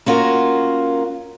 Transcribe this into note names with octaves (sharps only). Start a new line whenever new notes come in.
A#3 C#4 F4 F#4 A#4